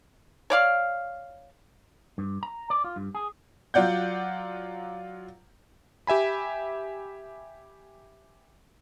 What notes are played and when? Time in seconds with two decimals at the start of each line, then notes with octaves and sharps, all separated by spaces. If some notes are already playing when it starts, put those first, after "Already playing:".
0.50 C#5 D5 F5
2.18 G2
2.43 A#5
2.70 D5
2.84 F4
2.96 G2
3.15 G#4
3.74 F#3 F4 D5 F#5 G6
6.07 G4 E5 G#5 B5